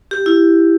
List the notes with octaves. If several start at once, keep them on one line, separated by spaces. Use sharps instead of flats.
G4
E4